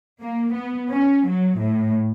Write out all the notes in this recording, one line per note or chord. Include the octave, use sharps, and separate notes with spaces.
A#3
B3
C#4
F#3
A2